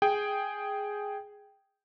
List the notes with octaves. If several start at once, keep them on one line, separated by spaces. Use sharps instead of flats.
G#4 G5